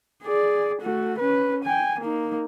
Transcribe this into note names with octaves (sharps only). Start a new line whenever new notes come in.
G#4 D5
A3 F#4
C#4 B4
G5 G#5
A#3 D#4